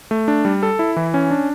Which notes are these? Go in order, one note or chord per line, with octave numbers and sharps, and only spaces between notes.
A3
D4
G3
A4
E4
E3
C#4
D4